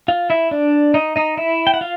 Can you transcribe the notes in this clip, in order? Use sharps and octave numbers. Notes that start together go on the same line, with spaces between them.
F4 F5
E4 E5
D4 D5
D#4 D#5
D#4 D#5
E4 E5
G5
F#5
F4 F5